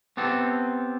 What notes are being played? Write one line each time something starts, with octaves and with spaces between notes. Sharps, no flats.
B3 C4 G4 A4